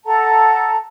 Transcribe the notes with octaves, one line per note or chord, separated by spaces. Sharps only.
A4 F#5 A5 A#5